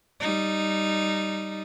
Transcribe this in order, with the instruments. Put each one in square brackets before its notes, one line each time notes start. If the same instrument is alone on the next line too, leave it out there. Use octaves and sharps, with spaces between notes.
[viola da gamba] G3 D#4